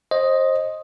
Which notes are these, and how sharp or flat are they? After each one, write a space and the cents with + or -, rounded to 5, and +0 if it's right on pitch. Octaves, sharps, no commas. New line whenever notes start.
C5 +25 D#5 +0